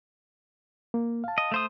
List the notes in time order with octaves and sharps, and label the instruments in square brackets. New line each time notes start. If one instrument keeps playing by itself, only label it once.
[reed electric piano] A#3
F5 A5
[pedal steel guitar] D#5
A3 C5 D#6